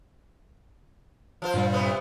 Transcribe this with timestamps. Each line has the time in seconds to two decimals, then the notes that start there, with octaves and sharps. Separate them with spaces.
1.42 F3 F4 C5
1.54 G2 A#2 G3
1.72 C3 B3 C4